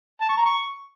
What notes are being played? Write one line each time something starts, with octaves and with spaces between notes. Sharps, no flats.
A5
C#6
A#5
C#6